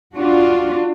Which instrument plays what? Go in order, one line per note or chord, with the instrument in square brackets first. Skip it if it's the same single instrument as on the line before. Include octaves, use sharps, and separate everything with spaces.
[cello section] D4 F4 F#4